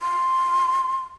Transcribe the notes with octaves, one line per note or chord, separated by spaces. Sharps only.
C6